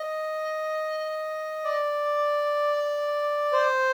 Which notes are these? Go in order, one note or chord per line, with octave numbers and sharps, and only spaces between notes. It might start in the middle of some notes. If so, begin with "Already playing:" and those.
Already playing: D#5
D5
C5